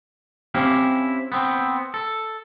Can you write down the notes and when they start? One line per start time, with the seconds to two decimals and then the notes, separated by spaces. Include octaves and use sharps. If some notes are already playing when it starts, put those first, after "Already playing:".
0.54 C4 C#4 E4 G4 F5
1.32 B3 C4
1.94 A4